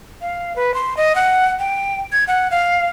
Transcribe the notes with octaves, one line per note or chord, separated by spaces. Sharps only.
F5
B4
C6
D#5
F#5
G5
G#6
F#5
F5